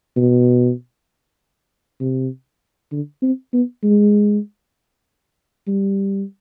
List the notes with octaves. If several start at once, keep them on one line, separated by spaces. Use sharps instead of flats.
B2
C3
D3
C4
B3
G#3
G3